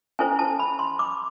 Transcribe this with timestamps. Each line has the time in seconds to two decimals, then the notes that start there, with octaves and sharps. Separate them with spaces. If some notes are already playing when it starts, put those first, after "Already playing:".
0.19 C#4 E4 A4 C5 G#5
0.39 A5
0.59 B5
0.79 C6
0.99 D6